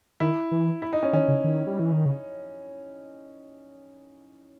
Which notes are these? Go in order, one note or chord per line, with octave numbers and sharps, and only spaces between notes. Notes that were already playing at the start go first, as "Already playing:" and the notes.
D#3 E4
E3
E4
D#4
C#4
D#3 C#4
C#3
D#3
G3
E3
D#3
C#3